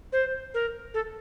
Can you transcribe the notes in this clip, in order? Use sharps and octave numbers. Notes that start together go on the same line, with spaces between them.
C5
A#4
A4